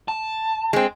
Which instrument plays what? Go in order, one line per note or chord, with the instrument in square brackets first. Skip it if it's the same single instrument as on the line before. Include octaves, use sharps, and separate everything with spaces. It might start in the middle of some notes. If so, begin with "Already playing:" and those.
[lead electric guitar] A5
[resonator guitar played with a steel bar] G#3 C4